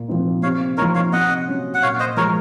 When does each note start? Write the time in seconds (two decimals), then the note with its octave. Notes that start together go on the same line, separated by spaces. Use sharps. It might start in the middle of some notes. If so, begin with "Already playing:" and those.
Already playing: A#2
0.08 F3 C4 D#4
0.43 C3 C#5 F5
0.77 F3 C4 D#4 A#4 C#5
0.95 C#5 F5
1.13 C3 D#5 F#5
1.48 F#3 C#4
1.74 F#5
1.82 A#2 C#5 F5
2.00 C5 D#5
2.17 F3 G#3 A#4 C#5